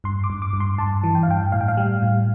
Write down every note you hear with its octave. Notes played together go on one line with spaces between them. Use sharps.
G2 C6
D6
G2
D6
G2
C6
G2 A5
E3
G5
F5
G2 G5
A2 F5
G5
F5
G3
A2